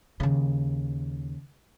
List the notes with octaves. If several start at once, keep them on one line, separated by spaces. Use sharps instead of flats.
D#2 C#3